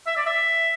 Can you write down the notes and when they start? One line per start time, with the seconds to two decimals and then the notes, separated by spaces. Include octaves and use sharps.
0.07 E5
0.16 D5
0.26 E5